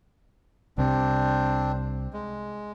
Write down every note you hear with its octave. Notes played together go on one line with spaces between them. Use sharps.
C2 C3 C4 D4
G#3